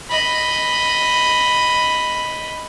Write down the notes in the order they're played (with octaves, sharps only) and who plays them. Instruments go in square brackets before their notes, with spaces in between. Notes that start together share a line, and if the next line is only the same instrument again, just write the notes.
[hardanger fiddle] D#5 B5